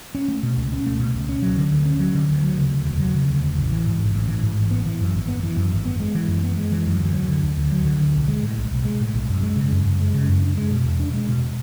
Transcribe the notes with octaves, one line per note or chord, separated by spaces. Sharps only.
C#4
A3
B2
C#2
C#4
A3
B2
C#2
C#4
F#3
D3
D2
C#4
F#3
D3
D2
F#3
C#3
D2
E1
F#3
C#3
D2
E1
A1
E3
G#2
A1
A1
E3
G#2
A1
B3
E3
F#2
G#1
B3
E3
F#2
G#1
B3
G#3
E3
F#2
B3
G#3
E3
F#2
D2
F#3
D3
D2
D2
F#3
D3
D2
B1
G#3
A2
B1
B1
G#3
A2
B1
F#2
G#3
C#3
F#2
F#2
G#3
C#3
F#2
D4
G#3
B2
E2
D4
G#3
B2